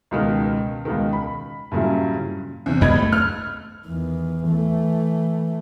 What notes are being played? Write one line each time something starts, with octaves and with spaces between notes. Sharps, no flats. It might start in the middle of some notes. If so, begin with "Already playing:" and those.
C#2 B2 D#3
C#2 B2 D#3
B5
G2 A#2 C#3 F#3 E4
E2 C3
C#2 F#2 B3 D#5 B5 G#6
A3
F6
E2 D#3
E3 A3